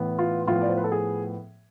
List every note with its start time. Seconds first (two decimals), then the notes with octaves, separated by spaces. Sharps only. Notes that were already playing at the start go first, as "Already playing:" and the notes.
Already playing: A2 E3 B3
0.19 F4
0.47 A2 F3 B3 F4
0.62 D5
0.70 C5
0.77 B4
0.84 A4
0.92 G#4